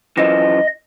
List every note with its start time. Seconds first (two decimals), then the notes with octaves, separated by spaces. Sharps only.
0.17 F#2 E3 F3 D#5